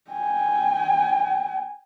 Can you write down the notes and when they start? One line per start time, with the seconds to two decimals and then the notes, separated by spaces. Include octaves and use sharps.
0.11 G5 G#5